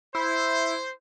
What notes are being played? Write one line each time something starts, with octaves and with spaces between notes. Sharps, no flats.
E4 C5